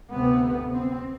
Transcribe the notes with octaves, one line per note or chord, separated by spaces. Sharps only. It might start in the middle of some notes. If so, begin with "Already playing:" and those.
D2 C3 B3
C4